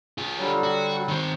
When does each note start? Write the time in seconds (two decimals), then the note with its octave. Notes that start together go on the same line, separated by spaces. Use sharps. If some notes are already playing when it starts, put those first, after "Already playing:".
0.18 F4 G#4
0.37 D3 F#3 G3
0.63 F#4
1.08 D#3 C4